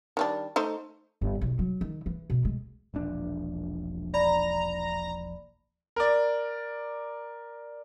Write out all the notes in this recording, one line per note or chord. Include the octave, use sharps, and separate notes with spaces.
D#3 G3 D4
A3 D#4 C5
G1
B1
F#3
D#3
E3
B2
G#3
E1 A#1 D4
D5 A#5 B5
A#4 D5